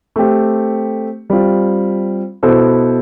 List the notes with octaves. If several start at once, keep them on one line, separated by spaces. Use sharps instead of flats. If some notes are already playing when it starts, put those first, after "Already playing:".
A3 C4 G4
G3 C4 F4
B2 B3 E4 A4 C5